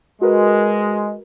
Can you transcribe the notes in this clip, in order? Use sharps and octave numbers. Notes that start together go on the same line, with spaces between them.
G#3 F#4 A#4 B4